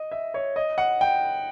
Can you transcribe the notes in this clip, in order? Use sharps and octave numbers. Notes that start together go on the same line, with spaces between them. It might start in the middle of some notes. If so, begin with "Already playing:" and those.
Already playing: D#5
E5
C#5
D#5
F#5
G5